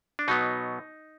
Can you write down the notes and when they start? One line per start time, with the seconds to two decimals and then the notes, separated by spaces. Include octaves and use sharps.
0.19 D4
0.28 B2 F#3 B3 D#4